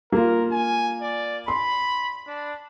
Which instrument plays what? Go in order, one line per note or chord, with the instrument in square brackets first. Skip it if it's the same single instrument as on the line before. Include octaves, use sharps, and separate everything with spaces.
[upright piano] A#3 F4 [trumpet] A#4
[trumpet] G#5
D5
[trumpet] B5 [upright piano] C6
[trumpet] D4